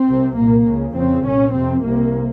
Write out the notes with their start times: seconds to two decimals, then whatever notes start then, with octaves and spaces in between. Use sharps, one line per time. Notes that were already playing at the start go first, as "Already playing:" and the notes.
Already playing: C4
0.09 C2 C3
0.38 C2 A#2 A#3
0.67 C#2 C#3
0.96 F2 C#3 C4
1.25 C2 A#2 C#4
1.54 F2 C3 C4
1.84 C2 C3 A#3